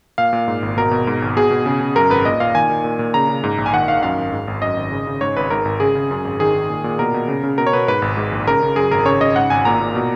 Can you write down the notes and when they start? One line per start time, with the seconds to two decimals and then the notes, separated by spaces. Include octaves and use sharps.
0.18 A#2 F5
0.33 A#2
0.48 G#2
0.63 G#1
0.77 B2 A#4
0.91 B2
1.07 G#2
1.22 G#1
1.37 B2 G#4
1.51 B2
1.66 C#3
1.81 C#3
1.96 F#2 A#4
2.10 G#1 B4
2.25 A#2 D#5
2.40 A#2 F5
2.55 D#3 G#5
2.69 D#3
2.84 A#2
2.99 A#2
3.14 C#3 A#5
3.29 C#3
3.44 G#2
3.58 A#1
3.66 G#5
3.73 D#3 F#5
3.88 D#3 F5
4.03 F#2 F5
4.17 G#1
4.33 G#2
4.48 G#1
4.62 F#2 D#5
4.77 G#1
4.91 C#3
5.07 C#3
5.21 G#2 C#5
5.37 G#1 B4
5.51 G#2 A#4
5.65 G#1
5.80 C#3 G#4
5.95 C#3
6.11 F#2
6.25 G#1
6.40 D#3 G#4
6.55 D#3
6.70 A#2
6.84 A#2
6.99 B2 A#4
7.14 B2
7.28 C#3
7.44 C#3
7.58 B2 A#4
7.67 C#5
7.73 B2 B4
7.88 G#2 B4
8.02 G#1
8.17 G#2
8.32 A#1
8.47 C#3 A#4
8.62 C#3
8.76 F#2 G#4
8.91 G#1 A#4
9.06 C#3 C#5
9.21 C#3 D#5
9.36 G#2 F#5
9.50 G#1 G#5
9.65 A#2 A#5
9.80 A#2
9.95 B2